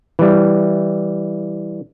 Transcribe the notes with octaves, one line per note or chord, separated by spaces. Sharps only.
E3 G3